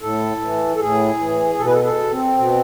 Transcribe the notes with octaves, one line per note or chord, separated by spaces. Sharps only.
A2 A4
E3
A4
A2 G#4
E3
B2 A4
B4
A4
A4
C4
B2